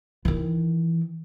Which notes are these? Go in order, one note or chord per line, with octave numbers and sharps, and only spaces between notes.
D#3 E3